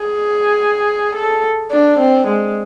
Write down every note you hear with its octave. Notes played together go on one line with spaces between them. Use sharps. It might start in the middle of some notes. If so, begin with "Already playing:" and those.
Already playing: G#4
A4
D4
C4
G#3